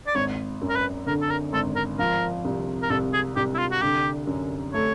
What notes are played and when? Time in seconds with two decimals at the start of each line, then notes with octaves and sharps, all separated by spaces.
0.07 D5
0.15 G#1 C#5
0.62 F#2
0.69 A#4
0.76 B4
1.07 D3 A#4
1.21 A4
1.30 A#4
1.53 G#1 A4
1.76 A#4
1.99 F3 A#4
2.45 C2
2.82 A#4
2.90 C2 A4
3.13 G#4
3.36 C2 G4
3.55 E4
3.59 F4
3.71 F#4
3.82 D3 G4
4.27 F#2
4.73 A3 C#5